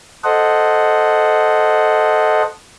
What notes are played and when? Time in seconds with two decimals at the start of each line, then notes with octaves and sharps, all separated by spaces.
0.24 A4 C5 D#5 F#5